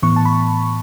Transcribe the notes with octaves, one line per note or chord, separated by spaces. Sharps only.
A2 E3 B3 C#6
A5
B5